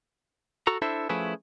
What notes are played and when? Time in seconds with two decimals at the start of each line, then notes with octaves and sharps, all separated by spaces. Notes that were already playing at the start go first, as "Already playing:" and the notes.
0.67 F#4 A4 A#5
0.82 D4 E4 A4 C5 E5
1.09 F3 A3 C#4 E4 G#4 B4